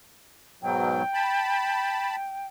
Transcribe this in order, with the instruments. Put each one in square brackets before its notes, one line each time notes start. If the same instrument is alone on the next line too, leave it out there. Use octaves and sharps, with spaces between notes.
[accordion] G#2 B2 F#3 [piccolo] G5
[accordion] A5 B5